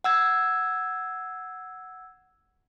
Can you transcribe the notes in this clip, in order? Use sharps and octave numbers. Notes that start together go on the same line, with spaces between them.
F#5 E6 G#6